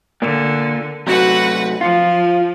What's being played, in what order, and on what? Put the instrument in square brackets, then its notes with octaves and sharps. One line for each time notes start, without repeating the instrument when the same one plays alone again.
[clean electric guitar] A#2 A#3 [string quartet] D3
[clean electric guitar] C3 F#3 A3 [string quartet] F#4 B4 F#5
[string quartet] F3 [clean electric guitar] F4